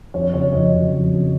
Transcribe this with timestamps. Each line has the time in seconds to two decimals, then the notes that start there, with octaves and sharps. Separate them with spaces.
0.14 F2 C#5
0.34 C#3 F#3 C#5
0.53 F2 D#5
0.73 C#3 F#3
0.92 F2
1.12 C#3 F#3